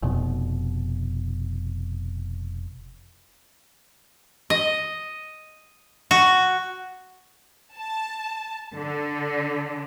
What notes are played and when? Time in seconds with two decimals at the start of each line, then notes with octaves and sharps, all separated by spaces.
0.03 F1 B2
4.50 D#5
6.11 F#4
7.75 A5
8.75 D3